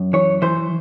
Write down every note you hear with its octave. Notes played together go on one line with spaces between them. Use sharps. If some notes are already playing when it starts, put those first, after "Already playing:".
Already playing: F#2
E3 C#5
E3 C5